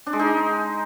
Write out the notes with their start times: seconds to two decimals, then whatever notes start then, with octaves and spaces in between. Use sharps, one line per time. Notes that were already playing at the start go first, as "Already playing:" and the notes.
0.06 D4
0.13 G#3
0.19 D#4